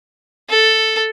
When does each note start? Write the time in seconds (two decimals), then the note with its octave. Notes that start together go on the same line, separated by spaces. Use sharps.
0.50 A4